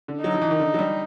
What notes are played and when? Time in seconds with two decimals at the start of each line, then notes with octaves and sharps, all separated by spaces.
0.08 D3
0.21 F#3 D#4
0.34 F3
0.42 E3
0.51 D#3
0.60 D3
0.74 F#3
0.79 G3